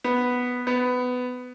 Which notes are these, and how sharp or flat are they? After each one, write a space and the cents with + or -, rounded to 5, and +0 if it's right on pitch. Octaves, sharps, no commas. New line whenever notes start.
B3 +0
B3 +15